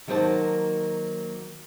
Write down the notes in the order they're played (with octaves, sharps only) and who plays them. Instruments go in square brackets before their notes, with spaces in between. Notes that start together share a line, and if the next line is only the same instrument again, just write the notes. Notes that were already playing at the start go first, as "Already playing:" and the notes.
[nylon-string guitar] D#3 F#3 A#3 C5 C#5 A5